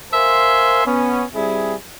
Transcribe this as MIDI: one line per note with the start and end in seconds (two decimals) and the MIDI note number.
0.13 0.84 70
0.13 0.84 72
0.13 0.84 76
0.13 0.84 77
0.13 0.84 80
0.13 0.84 84
0.86 1.24 59
0.86 1.24 61
1.35 1.75 55
1.35 1.75 60
1.35 1.75 64
1.35 1.75 68